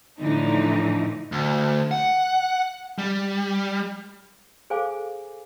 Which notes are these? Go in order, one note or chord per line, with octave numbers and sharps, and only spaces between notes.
A2 D3 E3 F3 D#4
D2
F#5
G3
G#4 A4 C5 F5 G#5 D6